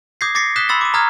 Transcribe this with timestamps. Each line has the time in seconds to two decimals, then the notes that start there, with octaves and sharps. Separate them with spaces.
0.21 D6 D#6 G6 G#6 A#6 C7
0.35 D6 A6 A#6 C7 C#7
0.56 D#6 F#6 G6 B6 E7 G7
0.69 B5 C6 E6 A6 C#7
0.81 D6 D#7
0.94 A#5 D#6 F6 G#6